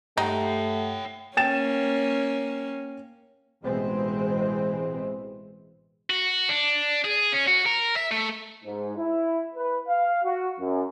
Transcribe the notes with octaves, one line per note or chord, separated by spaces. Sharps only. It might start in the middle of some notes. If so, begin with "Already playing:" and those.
G2 A3 D#4 G4 C#5 F#5 G5
A#3 C#4 G5 A6 E7
A1 B2 E3 G#3 C4
F#4
D4
G#4
C#4
F#4
A#4
E5
A3
G#2
E4
B4
F5
F#4
F#2